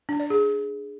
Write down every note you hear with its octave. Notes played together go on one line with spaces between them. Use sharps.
D4
D5
G#4